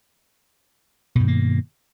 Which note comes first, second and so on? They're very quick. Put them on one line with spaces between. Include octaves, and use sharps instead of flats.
B2 G2 D#3 A#3